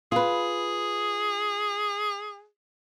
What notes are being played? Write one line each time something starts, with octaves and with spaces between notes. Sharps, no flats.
F4 G#4 B4